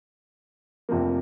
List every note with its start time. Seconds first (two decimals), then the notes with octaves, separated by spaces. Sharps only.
0.89 F1 F2 C3 F3 A#3